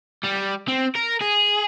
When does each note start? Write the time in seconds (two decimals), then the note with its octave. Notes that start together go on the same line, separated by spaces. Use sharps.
0.23 G3
0.68 C4
0.96 A#4
1.21 G#4